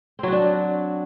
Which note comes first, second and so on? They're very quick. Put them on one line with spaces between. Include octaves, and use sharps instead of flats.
C4 F#3 F#4 D4